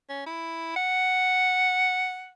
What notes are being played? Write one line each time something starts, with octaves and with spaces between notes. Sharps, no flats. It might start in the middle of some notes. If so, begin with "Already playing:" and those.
C#4
E4
F#5